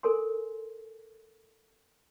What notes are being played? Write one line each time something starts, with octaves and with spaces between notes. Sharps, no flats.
A4 A#4 G#5 C6